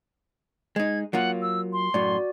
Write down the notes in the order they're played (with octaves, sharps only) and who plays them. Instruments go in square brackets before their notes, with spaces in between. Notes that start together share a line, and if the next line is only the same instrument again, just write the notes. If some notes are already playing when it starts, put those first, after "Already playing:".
[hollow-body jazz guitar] G#3 D#4 [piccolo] G#6
[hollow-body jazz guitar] F#3 A#3 F4 [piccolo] F#5
[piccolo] E6
C6
[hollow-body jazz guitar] F#2 A2 [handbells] F#4 D5